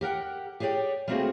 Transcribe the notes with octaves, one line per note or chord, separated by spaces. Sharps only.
G4 A#4 F#5 G5
G4 G#4 C#5 D5 G5
G3 A3 A#3 C4 F#4 G#4